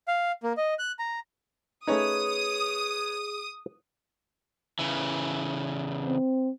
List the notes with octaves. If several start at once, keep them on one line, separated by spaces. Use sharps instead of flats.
F5
A#3
D#5
F#6
A#5
A3 C#4 D#4 G#4 B4 C#5 D#6
C#3 E3
C4